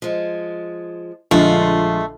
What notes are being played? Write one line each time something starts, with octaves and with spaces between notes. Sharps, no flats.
F3 G#3
A#1 D3 G#3 A3 F4 F5